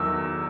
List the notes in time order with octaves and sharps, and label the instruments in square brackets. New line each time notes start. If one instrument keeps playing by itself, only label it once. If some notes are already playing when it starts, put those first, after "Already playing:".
Already playing: [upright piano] E2 D#3 F#3 E6